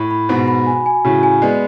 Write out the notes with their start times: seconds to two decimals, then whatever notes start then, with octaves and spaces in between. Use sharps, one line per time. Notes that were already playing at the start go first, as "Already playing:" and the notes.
Already playing: A2 B5
0.11 B5
0.29 G#2 B2 F#4
0.48 B5
0.66 G#5
0.86 G#5
1.05 A2 C#3 F#4
1.23 G#5
1.42 G#3 B3 D5